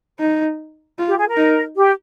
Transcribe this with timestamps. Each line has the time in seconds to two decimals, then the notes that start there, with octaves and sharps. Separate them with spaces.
0.20 D#4
0.98 F4
1.08 G4
1.18 G#4
1.28 A#4
1.37 D#4
1.77 G4